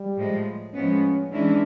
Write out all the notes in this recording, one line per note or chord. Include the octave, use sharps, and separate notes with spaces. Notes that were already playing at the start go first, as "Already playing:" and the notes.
Already playing: G3
A2 F3 G#3
A2 F3 G#3 B3 C#4
E3 G#3 C#4 D4 E4